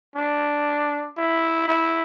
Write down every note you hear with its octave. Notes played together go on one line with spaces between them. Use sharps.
D4
E4
E4